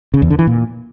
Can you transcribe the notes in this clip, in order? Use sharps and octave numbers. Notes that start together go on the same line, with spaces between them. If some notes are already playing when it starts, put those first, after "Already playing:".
C#3
E2
D3
E3
A#2